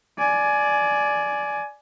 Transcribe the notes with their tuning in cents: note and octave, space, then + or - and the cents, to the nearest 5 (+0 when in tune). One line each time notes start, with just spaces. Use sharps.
D5 +0 G#5 +20